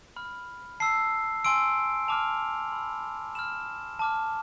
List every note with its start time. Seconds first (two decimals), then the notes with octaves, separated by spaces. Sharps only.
0.16 B5 F6
0.80 A5 E6 C7
1.44 G#5 C6 E6 D7
2.08 A5 D6 F6 F7
2.72 B5 E6
3.35 B5 F6 E7
3.99 A5 D6 F6